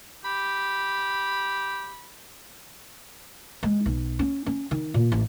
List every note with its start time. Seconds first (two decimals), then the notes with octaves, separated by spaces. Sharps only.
0.25 G4 B5
3.63 G#3
3.86 B1
4.19 C#4
4.46 C#4
4.71 D#3
4.94 A#2
5.12 A1